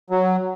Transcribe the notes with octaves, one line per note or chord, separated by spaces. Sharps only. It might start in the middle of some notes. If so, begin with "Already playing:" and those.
F#3